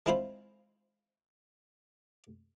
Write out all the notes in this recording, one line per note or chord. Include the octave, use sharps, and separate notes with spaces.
G#3 C4 E4 F4 C5 B5